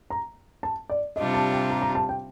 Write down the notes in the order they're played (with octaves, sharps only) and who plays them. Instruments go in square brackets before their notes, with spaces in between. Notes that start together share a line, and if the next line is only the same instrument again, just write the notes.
[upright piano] A#5
A5
D5
[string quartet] C3 G3 D4 F4 [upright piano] D#5
[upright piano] A5
G5
A#5
A#5
A5
G5